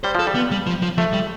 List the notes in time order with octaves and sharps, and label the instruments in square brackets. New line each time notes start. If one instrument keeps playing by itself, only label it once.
[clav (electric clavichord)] G3 [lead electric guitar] C5
[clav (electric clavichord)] F3 [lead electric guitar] A4
[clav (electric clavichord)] G3
[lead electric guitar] B3
G3
F3
F3
[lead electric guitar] F3 [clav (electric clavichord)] A3
[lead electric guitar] G3